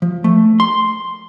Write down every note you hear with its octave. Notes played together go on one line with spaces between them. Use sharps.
F3
A3
C6